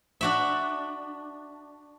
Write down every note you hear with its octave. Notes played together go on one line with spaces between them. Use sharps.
D4 F#4 E5